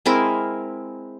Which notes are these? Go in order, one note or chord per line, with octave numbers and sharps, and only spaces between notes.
G#3 C4 E4 A#4